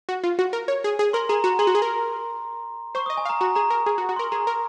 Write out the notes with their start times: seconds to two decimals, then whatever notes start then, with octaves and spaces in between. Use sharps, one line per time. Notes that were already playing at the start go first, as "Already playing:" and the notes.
0.09 F#4
0.24 F4
0.39 F#4
0.53 A#4
0.68 C#5
0.84 G#4
0.99 G#4
1.13 A#4 C6
1.29 G#4 A#5
1.44 F#4 A#5
1.59 G#4 C6
1.67 F#4
1.75 G#4
1.82 A#4
2.95 C5 C#6
3.06 D#6
3.10 D#5
3.17 G#5
3.25 F5
3.30 A#5
3.41 F#4 A#5
3.56 G#4 A#5
3.70 A#4 A#5
3.86 G#4
3.98 F#4
4.09 F#4
4.16 C6
4.19 A#4
4.32 G#4 A#5
4.47 A#4